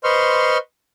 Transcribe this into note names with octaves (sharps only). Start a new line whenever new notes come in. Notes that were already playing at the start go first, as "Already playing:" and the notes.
B4 C5 D#5 C6 C#6 F6